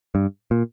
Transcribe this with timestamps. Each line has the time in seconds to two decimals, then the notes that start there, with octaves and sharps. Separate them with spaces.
0.15 G2
0.51 A#2